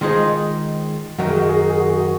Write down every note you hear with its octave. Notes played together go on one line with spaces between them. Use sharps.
D#3 G#3 D#4 F4 G#4 C5
F#2 D#3 A#3 D#4 F#4
G#4
F#4
G#4
F#4
G#4
F#4
G#4
F#4